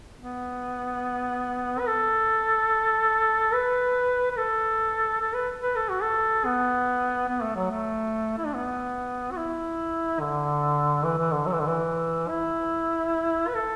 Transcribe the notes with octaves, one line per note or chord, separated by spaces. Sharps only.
B3
B4
A4
B4
B4
A4
A4
B4
B4
A4
F#4
A4
B3
B3
A3
F#3
A3
E4
D4
B3
F#4
E4
D3
E3
E3
D3
F#3
E3
D3
E3
E4
B4
A4